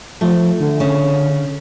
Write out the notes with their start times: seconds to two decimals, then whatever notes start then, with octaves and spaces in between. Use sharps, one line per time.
0.21 F3 A3
0.60 D3
0.80 C#3